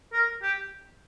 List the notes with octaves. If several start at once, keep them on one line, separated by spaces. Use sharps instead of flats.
A#4
G4